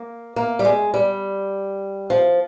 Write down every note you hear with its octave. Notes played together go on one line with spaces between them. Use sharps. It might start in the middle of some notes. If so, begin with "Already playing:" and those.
Already playing: A#3
A#3
G3
G#3
G3
F3